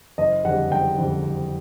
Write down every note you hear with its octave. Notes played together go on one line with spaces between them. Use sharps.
F#1 D#5
F2 D3 G3 F#5
F#1 G5
F2 D3 G3
F#1